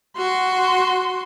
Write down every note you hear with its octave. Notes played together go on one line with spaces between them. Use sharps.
F#4 C6